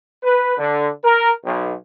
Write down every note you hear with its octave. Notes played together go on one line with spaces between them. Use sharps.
B4
D3
A#4
B1